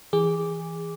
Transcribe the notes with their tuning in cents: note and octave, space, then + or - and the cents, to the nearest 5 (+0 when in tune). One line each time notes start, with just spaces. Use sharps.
E3 +0 G#4 -20 D6 -10